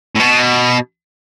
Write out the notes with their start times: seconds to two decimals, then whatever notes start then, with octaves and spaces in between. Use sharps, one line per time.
0.16 A2
0.20 B2